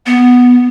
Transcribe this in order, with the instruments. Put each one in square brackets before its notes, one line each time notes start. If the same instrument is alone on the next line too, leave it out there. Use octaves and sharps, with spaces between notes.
[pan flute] B3